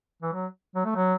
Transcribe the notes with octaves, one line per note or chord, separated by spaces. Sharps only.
E3
F#3
F#3
A3
F#3